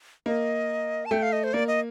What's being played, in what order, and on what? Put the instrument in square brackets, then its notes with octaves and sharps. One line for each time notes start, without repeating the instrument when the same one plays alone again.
[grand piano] A#3 [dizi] D#5
[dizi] A5
[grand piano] A3 [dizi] G5
[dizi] F5
D#5
C5
[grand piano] A#3 [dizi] D5
[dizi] D#5